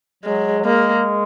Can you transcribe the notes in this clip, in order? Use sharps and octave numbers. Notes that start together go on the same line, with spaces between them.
F#3 G#3
F#3
G#3 A#3